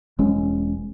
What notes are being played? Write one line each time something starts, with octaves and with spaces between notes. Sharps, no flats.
E1 G#3 C#4